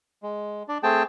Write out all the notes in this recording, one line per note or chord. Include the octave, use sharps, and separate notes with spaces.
G#3
D4 D5
A3 C4 G#4 G5 A5